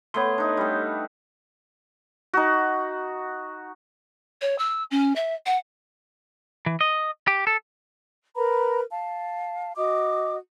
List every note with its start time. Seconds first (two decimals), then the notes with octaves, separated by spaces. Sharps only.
0.14 A3 B3 C#5 C6
0.38 D4 D#4
0.57 G3 A3
2.33 D#4 F#4
4.41 C#5
4.58 E6
4.91 C#4
5.16 E5
5.46 F#5
6.66 E3
6.81 D#5
7.27 G4
7.47 A4
8.36 A#4 B4 A#5 B5
8.91 F5 A5
9.76 F#4 D#5 D6 D#6